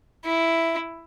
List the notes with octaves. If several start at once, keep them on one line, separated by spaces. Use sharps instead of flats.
E4